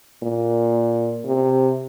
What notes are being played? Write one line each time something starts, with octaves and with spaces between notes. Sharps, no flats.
A#2
C3